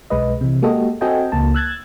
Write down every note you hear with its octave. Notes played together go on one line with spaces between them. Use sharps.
B1 G#3 B4 D#5
C3 E3
G#3 A#3 F#4 G4 A4 D#5
C4 F#4 A4 D#5 G5 G#5
C#2 A#3 A5
E6 F#6 G#6 A6